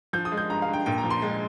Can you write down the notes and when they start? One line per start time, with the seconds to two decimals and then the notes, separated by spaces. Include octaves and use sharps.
0.13 F3 G6
0.25 D#6
0.32 G#3
0.37 G6
0.50 G2 A#5
0.62 F5
0.68 G2
0.73 G5
0.86 A#2 G5
0.98 A#5
1.03 F3
1.10 C6
1.22 G#3